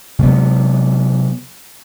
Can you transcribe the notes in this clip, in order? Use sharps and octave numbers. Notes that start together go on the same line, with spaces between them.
C3 F#3 G#3 B3